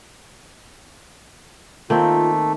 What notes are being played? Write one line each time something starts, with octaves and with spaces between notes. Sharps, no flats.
D#3 A3 A#3 C4 F4